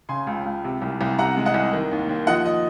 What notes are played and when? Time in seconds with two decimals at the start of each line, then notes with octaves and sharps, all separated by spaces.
0.09 C#3 G#5 C6
0.27 C#2
0.46 C#2
0.64 C3
0.82 C2
1.01 C2
1.18 C3 F#5 A#5
1.37 G#3
1.46 D#5 F#5
1.54 C2
1.73 D#3
1.91 D#2
2.09 D#2
2.27 F3 D#5 F#5
2.45 D#5